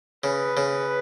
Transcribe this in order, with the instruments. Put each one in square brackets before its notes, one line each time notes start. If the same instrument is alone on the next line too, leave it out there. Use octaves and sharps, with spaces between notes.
[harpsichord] C#3 [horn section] B4
[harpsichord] C#3